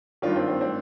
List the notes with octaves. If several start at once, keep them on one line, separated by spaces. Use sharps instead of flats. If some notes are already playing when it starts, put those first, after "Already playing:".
G2 D#3 D4 F4
C4
C4
C4